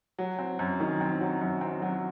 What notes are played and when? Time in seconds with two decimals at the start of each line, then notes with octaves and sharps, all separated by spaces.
0.19 F#3
0.39 C4
0.59 F#2
0.80 D#3
1.01 C4
1.21 F#3
1.41 F#2
1.61 C4
1.82 F#3